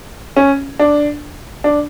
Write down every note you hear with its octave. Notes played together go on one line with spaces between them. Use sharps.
C#4
D4
D4